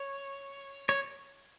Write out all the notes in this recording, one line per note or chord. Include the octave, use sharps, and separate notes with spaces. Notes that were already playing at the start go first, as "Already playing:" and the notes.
Already playing: C#5
C#5